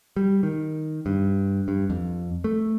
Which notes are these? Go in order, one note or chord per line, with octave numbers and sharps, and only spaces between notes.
G3
D#3
G2
G2
F2
A3